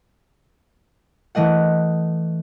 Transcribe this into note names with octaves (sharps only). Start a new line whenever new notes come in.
E3 A3 D#5 F#5